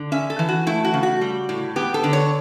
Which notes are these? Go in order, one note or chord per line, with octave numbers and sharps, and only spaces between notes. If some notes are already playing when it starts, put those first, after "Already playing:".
Already playing: D3
C#4 E5
A4
E3
F#4
A3 E4
F#4
C#3
F#4
G3
A2
B3 G4
A4
D3
C#5